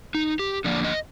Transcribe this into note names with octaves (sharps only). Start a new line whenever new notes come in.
D#4
G4
D3 F3 A#3 D5
D#5